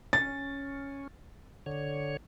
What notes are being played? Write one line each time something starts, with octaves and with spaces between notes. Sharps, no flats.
C#4 A6
D3 C#5